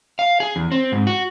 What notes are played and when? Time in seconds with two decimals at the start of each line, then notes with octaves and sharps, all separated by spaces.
0.19 F5
0.40 G#4
0.56 E2
0.72 C4
0.92 G#2
1.07 F#4